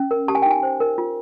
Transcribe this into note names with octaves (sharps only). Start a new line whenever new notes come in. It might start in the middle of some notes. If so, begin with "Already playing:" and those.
Already playing: C#4
A#4
G4 A5
G#5
G5
D#4 G#5
C5
A#4
F4